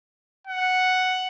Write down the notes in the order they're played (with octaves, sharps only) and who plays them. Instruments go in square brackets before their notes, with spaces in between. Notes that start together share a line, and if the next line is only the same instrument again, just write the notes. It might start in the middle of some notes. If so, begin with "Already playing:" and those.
[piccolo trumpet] F#5